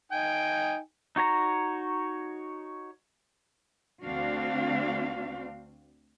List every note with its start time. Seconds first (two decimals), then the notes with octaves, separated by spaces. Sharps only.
0.12 D#4 G5 G#5
1.16 D#4 F#4 C#5 A#5
4.03 D2 C4 D4 F#4 F5